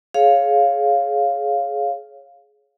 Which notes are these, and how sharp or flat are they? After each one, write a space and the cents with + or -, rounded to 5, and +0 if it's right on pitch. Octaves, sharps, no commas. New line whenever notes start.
G#4 +20 C#5 +0 F5 +0